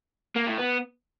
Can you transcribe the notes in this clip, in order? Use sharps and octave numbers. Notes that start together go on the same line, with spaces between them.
A#3
A2
B3